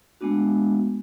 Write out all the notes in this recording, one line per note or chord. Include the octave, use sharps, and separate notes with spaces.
G#3 A3 B3 D4 F#4